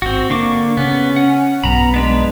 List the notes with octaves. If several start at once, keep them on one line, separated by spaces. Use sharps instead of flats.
G#1 C4 F#4
D3 A#3 D4 C#6 D6
C#3 B3 C#4
F#5
B1 G2 F#3 B3 A#5 B5
G#3 B3 D4 B4